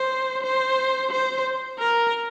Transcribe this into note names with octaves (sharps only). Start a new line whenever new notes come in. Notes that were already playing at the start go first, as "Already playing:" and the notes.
Already playing: C5
C5
C5
A#4